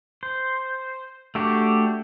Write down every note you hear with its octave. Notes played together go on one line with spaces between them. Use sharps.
C5
A3 D4 F#4 G4